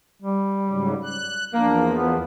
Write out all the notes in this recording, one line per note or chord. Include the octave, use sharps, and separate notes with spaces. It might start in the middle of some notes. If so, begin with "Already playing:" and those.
G3
G#2 C#3 F#3
F#6
E2 F3 A#3 D4
B3